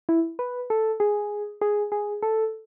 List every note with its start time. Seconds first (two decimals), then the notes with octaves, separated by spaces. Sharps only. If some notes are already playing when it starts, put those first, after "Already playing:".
0.09 E4
0.39 B4
0.70 A4
1.00 G#4
1.61 G#4
1.92 G#4
2.23 A4